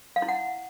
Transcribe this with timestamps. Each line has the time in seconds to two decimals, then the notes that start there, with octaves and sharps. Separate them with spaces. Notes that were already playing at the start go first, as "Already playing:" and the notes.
0.16 F5
0.22 E4
0.28 F#5